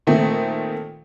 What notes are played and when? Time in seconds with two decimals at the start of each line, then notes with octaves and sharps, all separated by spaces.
0.07 A#2 D#3 A3 C4